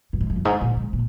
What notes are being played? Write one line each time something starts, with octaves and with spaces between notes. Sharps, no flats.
G2
G#2
F2
G2
G#2
A#2
G#2
A#2